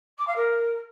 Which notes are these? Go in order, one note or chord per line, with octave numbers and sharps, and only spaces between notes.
D6
F5
A#4